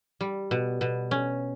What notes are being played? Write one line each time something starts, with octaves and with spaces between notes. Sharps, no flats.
G3
B2
B2
C#4